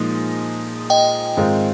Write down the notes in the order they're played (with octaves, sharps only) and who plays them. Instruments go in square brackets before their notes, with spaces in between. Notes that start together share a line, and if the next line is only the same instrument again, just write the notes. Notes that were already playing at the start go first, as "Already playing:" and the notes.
Already playing: [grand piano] A#2 F3 G#3 D#4
[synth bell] D#5 G5
[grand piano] G#2 D#3 G#3 C4 F4